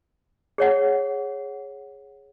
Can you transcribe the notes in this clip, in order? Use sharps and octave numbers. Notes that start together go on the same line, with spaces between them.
G#4 C#5 F#5